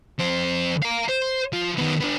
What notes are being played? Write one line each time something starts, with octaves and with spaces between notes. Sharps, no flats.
F2 C5
F5 A#5
C5
F3 F4
D#3 B3
B3 D4